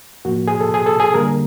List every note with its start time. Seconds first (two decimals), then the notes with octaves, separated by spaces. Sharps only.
0.25 A2 F3 A#3 F#4
0.48 G#4
0.60 A4
0.74 G#4
0.86 A4
1.00 G#4
1.13 D3 G3 A#3 A#4